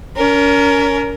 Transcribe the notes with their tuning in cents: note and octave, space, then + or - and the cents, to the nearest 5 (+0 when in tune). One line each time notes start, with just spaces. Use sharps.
C#4 +35 A#4 +0